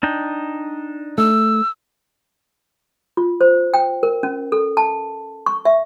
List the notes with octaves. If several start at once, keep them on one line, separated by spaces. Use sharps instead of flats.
D4 D#4 G5
A3 E6
F4
C5
G5
A#4
C#4
A4
A5
C#6
E5